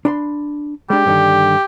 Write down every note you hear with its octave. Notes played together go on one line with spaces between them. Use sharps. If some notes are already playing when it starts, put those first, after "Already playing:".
D4 B5 C6
G#3 D4 G4
G2 D3 D#3